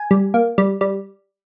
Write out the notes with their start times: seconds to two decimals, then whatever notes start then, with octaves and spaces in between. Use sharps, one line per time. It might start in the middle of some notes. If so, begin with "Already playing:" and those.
Already playing: G#5
0.11 G3
0.34 A#3
0.58 G3
0.81 G3